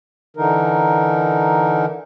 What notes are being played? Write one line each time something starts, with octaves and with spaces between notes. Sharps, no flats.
D3 E3 D#4 A#4